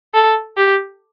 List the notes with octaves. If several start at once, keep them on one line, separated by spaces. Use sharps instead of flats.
A4
G4